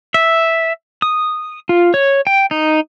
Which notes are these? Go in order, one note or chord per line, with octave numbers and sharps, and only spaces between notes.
E5
D#6
F4
C#5
G5
D#4